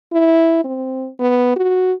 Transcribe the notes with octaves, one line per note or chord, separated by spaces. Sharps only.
E4
C4
B3
F#4